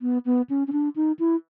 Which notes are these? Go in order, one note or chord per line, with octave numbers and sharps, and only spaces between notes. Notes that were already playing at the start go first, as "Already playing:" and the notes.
B3
B3
C#4
C#4
D4
D#4
E4